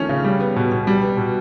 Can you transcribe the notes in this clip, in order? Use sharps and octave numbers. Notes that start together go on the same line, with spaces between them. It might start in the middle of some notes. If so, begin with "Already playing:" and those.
Already playing: D#3 F3 A3 C#4
C#3
G3
B3
B2
B2
G3
B3
B2